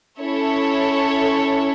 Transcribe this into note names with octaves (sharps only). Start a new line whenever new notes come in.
C#4 E4 A4 C#5